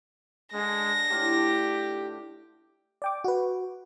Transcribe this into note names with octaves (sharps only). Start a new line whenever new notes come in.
D3 G#3 G#4 A#6
A2 D4 F4 G4
D5 G5 D6
F#4 B4